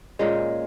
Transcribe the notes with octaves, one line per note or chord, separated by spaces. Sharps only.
A#2 G#3 C#4